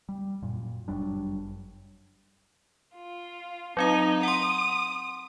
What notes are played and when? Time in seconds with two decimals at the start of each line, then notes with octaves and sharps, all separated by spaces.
0.09 G3
0.42 F#2 A#2
0.88 G1 F#2 G3 D4
2.95 F4
3.77 F#3 C4 D#4 F5
4.23 F#5 C6 D#6